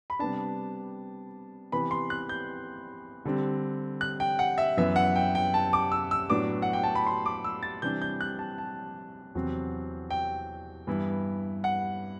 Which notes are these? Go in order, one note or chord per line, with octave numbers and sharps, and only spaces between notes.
B5
C3 G3 B3 D4 A5
C3 E3 B3 B5
C6
F#6
G6
D3 G3 C4
F#6
G5
F#5
E5
F#2 E3 B3 E5
F#5
G5
G5
A5
D6
E6
E6
A2 F#3 B3 D4 D6
F#5
G5
A5
B5
C6
D6
E6
A6
C3 E3 G3 D4 G6
G6
F#6
A5
A5
E2 C3 F#3 C4
G5
G2 E3 B3 E4
F#5